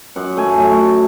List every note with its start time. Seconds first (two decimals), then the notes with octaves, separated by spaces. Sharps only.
0.16 F#2 F#5
0.37 A3 F#4 G#5
0.60 F#3 A3